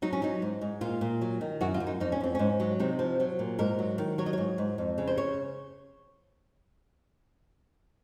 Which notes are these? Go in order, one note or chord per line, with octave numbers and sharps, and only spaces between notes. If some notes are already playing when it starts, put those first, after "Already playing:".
F#3 D#4
C#4
F#3 D#4
G#2
G#2
A#2 F4
A#2
F#3
D#3
F#2 F#4
F4
F#2
D#4
F2 D#4
C#4
F2 C4
G#2 C#4
F#3
C3 D#4
F3
F#3
A#2
G#2 A#4
F#3
D#3
F#3 C#5
D#5
G#2 C#5
G#2
F2
C#3
C5
C#5